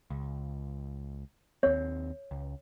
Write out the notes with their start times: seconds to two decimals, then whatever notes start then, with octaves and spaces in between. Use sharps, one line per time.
0.10 C#2
1.63 D#2 C4 C#5
2.31 C#2